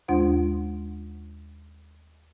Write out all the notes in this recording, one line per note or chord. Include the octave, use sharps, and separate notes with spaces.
D#2 G#3 D4 F4 C5 F#5